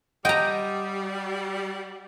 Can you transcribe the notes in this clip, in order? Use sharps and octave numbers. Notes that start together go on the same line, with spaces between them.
G3 D#5 F#5 G5 A#5